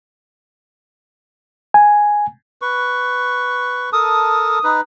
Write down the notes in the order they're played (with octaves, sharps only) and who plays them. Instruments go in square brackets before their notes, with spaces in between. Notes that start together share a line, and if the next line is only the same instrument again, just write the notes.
[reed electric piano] G#5
[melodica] B4 C#6
[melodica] A4 A#4 A5 [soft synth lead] D#6
[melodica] D#4 B4